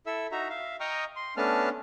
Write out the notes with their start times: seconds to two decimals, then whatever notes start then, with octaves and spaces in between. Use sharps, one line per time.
0.06 E4 A4 E5 E6
0.32 D#4 F#4 E5 A#5
0.50 E5 F5
0.80 D#5 G5 A#5 C#6 D#6 F6
1.16 C6
1.37 A3 B3 C#4 D4 A5 F6